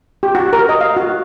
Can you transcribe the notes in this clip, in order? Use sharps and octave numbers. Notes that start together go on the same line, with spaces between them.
G4
F#4
A#4
D#5
F5
F#4